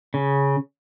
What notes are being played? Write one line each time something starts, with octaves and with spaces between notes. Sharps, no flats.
C#3